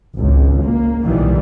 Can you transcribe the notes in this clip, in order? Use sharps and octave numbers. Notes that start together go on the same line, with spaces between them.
G#1 C#2
A#3
B1 A#2 D#3 E3 G3